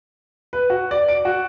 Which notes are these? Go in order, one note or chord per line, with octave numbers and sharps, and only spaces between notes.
B4
F#4
D5
D7
F#4